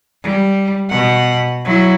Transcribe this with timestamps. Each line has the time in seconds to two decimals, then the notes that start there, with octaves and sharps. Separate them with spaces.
0.23 G3
0.90 B2 F#5
1.65 F#3 E4